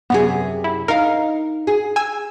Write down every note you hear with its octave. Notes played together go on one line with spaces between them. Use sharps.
F#2 C3 B3 G#4
E4
D#4 A#4 F5
G#4
G#5 E6